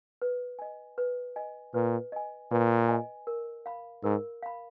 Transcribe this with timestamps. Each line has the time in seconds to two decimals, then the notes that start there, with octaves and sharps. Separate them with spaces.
0.22 B4
0.59 D#5 G#5
0.98 B4
1.36 D#5 G#5
1.74 A#2 B4
2.12 D#5 G#5
2.51 A#2 B4
2.89 D#5 G#5
3.27 A#4
3.66 F5 B5
4.03 G#2 A#4
4.43 F5 B5